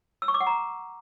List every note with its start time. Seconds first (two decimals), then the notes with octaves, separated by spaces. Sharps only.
0.22 E6
0.28 C#6
0.34 D6
0.40 F#5
0.47 A#5